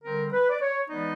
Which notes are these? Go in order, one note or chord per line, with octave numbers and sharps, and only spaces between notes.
D3 G3 C4 A#4
B4
D5
C#5
E3 G#3 B3 D#4 D5